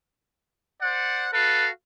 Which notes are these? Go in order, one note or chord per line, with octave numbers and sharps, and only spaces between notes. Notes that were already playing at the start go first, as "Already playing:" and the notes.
C5 D5 F#5
F#4 A4 B4 F5